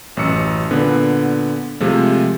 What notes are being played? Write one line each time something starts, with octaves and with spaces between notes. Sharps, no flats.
A1 F#2 E6 C#7
A#2 D3 B3
C3 F3 G#3 A3